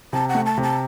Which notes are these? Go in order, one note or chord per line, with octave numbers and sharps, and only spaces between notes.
C3 A5
F#5
A3
A5
C3
A5